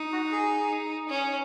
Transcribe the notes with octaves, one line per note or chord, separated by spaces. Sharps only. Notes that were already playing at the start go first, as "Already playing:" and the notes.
Already playing: D#4
F#4
G#4
C#4